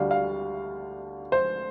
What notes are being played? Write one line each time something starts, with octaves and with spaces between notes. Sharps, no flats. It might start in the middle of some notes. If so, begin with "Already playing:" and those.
Already playing: D2 D3 G3 D4 F5
F5
C5